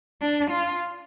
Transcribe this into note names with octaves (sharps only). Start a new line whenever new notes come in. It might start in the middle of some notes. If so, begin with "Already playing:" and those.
D4
F4